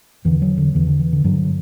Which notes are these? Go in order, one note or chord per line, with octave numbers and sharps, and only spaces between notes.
E2 D3 E3
F#3
D3
E2 D3 E3
D3
E3
D3
G2 D3 F#3